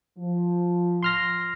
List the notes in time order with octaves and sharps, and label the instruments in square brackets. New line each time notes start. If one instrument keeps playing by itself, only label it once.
[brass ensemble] F3
[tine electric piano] C6 F6 A#6